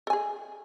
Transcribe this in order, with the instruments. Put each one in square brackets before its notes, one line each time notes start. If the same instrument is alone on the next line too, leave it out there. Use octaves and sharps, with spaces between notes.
[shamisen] A4
G#5
G#4